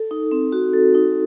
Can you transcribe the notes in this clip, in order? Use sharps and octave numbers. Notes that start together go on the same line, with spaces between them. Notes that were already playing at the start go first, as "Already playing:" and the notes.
Already playing: A4
D#4
C4
F#4
A4
D#4